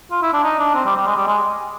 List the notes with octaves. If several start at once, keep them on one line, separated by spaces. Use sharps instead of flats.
F4
E4
D4
D#4
D4
C4
G3
G3
G#3
G3
G#3